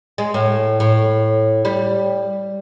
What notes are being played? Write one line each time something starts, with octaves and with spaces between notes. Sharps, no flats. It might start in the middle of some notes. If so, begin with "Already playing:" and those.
G#3
A2
A2
G3